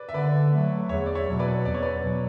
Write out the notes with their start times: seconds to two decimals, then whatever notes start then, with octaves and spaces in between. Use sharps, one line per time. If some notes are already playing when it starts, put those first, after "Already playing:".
Already playing: B4 D5
0.09 E5
0.14 D3 B4 D5
0.52 F#3 A3
0.89 E2 C#5 E5
1.06 D5
1.15 C#5 E5
1.27 B2 F#3
1.39 B4 D5
1.65 E2 D5
1.74 C#5
1.82 B4 D5
2.03 B2 F#3